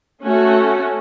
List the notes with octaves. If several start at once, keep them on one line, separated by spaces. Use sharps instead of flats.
A3 C#4 F#4